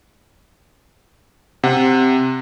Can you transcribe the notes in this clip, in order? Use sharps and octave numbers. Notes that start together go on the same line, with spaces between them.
C3 F#5